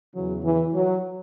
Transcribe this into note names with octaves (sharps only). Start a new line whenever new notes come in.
E2 C#3 E3 F#3
E3
F#3